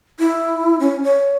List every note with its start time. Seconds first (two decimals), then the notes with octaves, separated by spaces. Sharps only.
0.19 E4
0.80 C#4
1.04 C#5